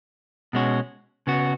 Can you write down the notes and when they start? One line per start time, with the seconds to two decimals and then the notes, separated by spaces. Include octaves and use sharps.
0.53 B2 G#3 C#4 F#4
1.27 C#3 B3 F#4